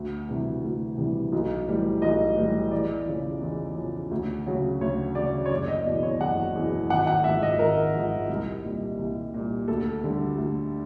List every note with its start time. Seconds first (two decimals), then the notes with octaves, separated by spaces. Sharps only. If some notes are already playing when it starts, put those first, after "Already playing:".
Already playing: D2
0.28 C3 E3 G3
0.64 D2
0.97 C3 E3 G3
1.32 B1
1.67 A2 E3 G3
2.02 B1 D#5
2.37 A2 E3 G3
2.71 E2 D5
3.07 C#3 F3
3.41 E2
3.76 C#3 F3
4.11 D2
4.47 C#3 F#3
4.81 D2 C#5
5.15 C#3 F#3 D5
5.46 C#5
5.50 F#1 D5
5.68 D#5
5.85 E2 B2 D5
6.03 C#5
6.21 F#1 F#5
6.55 E2 B2
6.90 G#1 F#5
7.07 F#5
7.24 G#2 F3 E5
7.43 D#5
7.59 G#1 A#4
7.95 G#2 F3
8.29 C2
8.63 A#2 G3
8.99 C2
9.34 A#2 G3
9.68 D2 A4
10.04 D3 G3
10.38 D2